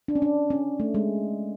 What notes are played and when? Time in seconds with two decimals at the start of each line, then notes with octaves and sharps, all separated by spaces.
0.08 D4
0.15 C#4
0.22 D4
0.50 C#4
0.80 A3
0.94 G#3